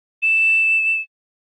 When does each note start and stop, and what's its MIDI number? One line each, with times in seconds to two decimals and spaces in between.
0.22 1.01 100